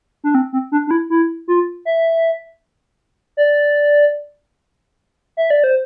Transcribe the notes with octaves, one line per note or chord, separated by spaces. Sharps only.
D4
C4
C4
D4
D4
E4
E4
F4
E5
D5
E5
D5
C5